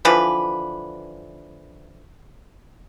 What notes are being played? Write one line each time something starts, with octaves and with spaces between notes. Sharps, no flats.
D3 E3 F3 B4